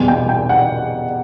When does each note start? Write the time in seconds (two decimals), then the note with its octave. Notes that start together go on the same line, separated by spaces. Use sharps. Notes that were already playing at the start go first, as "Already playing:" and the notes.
Already playing: E2 B2 G3 G#5
0.08 G5
0.29 G5
0.49 F#5